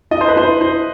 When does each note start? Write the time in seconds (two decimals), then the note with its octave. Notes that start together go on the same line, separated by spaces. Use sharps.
0.11 E4 D#5
0.21 C5
0.29 B4
0.36 E4 C5
0.61 E4 C5